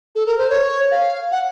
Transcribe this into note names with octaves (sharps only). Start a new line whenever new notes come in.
A4
A#4
C5
C#5
F5
F#5